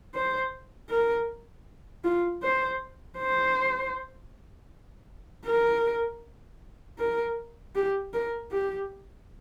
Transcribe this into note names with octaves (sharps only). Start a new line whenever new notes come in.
C5
A#4
F4
C5
C5
A#4
A#4
G4
A#4
G4